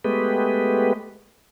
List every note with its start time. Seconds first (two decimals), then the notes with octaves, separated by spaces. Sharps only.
0.04 G#3 A3 B3 G4 B4